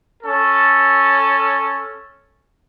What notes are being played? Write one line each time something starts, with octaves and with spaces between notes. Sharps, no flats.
C#4 A4